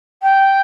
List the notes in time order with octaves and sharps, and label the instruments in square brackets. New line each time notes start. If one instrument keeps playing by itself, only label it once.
[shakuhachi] G5